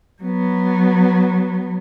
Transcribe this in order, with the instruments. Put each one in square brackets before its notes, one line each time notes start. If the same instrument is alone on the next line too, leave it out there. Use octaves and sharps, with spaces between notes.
[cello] F#3 B3